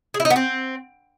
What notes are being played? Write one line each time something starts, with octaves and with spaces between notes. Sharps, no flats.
G#4
E4
D#4
B3
C4